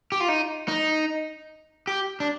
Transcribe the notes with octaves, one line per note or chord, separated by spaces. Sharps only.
G4
F4
D#4
D#4
G4
D4